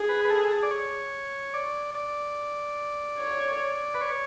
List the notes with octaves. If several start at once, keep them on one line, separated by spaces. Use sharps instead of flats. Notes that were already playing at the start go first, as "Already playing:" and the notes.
Already playing: G#4
B4
B4
A4
D5
C#5
D5
D5
C#5
B4
C#5